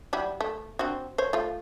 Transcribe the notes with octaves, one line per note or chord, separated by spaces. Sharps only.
F#3 G3 E4
A3
C4 D4 F#4
C5 C#5
A3 F4